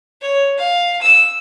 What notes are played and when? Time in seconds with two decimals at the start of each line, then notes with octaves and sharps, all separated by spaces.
0.21 C#5
0.58 F5
1.02 E6